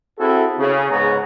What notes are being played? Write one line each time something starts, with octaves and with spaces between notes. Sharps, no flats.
C4 E4 F#4 G#4 A4
C#3
G#2 B3 G#4 B4 C#5 A#5